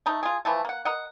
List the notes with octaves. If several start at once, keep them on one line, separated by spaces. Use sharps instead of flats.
A3 D#4
F4 G#4
E3 F3 A3
A#3 F#5
A#4 D#5 F#5